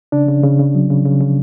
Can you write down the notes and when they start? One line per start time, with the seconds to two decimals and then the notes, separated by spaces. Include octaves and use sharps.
0.12 C#3 D4
0.28 C#3
0.44 C#3
0.59 C#3
0.75 F#3
0.90 C#3
1.05 C#3
1.21 C#3